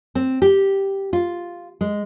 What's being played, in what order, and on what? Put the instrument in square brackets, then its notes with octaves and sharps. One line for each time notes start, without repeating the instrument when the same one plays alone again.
[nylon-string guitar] C4
G4
F4
G#3